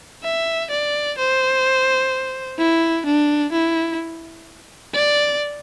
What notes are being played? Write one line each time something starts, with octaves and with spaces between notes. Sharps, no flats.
E5
D5
C5
E4
D4
E4
D5